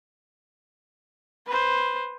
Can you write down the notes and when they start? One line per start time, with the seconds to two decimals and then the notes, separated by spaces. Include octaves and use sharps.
1.46 B4 C5